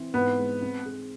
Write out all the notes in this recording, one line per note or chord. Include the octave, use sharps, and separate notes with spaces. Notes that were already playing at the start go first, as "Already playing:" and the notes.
Already playing: E3 C4
G#2 B3
G#3
C4
G#4